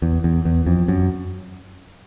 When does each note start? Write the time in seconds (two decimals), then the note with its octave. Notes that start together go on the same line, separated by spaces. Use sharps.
0.02 E2
0.24 E2
0.45 E2
0.67 F2
0.88 F#2